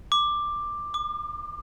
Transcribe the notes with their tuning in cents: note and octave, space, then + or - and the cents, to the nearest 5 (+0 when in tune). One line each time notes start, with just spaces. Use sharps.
D6 +10
D6 +40